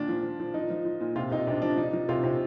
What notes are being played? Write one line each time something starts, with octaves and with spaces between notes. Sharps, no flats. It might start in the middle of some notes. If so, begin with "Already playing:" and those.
Already playing: A#2 D#3 D4
F3
F3
F3
F3 D#4
F3
F3
A#2
C3 F4
C3 D#4
C3 D4
F3 D4
F3 D#4
F3
C3 F4
C3